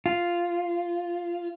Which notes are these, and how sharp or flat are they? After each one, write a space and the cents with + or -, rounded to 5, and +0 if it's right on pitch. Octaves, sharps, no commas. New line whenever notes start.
F4 -5